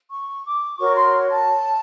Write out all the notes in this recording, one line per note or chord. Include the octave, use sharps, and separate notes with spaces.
C#6
D6
F#4 A#4 C#5 C#6
C6
A5